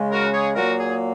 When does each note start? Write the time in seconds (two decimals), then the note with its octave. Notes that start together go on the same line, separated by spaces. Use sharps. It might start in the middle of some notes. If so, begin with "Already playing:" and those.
Already playing: C#3 G#3
0.12 F#4 A#4
0.34 G#4 C#5
0.56 A#2 F#3 A#3 F#4 A#4
0.79 G#4